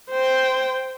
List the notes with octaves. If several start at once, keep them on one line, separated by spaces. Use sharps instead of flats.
C5 G5